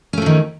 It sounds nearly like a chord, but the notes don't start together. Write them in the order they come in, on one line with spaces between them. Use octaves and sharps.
C#4 A3 F3 D#3